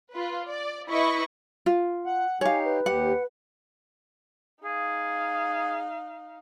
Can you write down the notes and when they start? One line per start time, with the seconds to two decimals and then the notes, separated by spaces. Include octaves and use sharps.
0.11 F4 B4
0.47 D5
0.90 E4 B4 D#5 B5 C#6
1.66 F4
2.06 F#5
2.41 D#4 G4 C#5 F5 G#5
2.65 B4
2.86 D#2 G4 F#5
4.64 D#4 G#4 F5